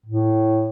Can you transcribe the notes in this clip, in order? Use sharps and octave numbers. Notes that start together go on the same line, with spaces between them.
A2